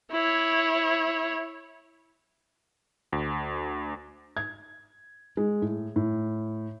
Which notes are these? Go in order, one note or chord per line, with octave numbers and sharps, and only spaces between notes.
E4 C#5
D2
G#6
G#3
A2
A2